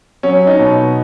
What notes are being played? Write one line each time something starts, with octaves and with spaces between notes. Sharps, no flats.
F#3 C#4
D#4
B2